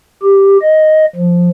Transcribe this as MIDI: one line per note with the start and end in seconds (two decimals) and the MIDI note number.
0.22 0.57 67
0.62 1.06 75
1.16 1.49 53